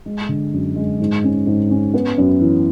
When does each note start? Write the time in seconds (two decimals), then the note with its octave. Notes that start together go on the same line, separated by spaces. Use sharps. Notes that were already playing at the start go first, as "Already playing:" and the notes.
0.06 G#3
0.29 D3
0.53 F#2
0.76 G#3
1.00 G#2
1.24 C#4
1.47 G#2
1.70 C#4
1.94 B3
2.18 F#2
2.41 E3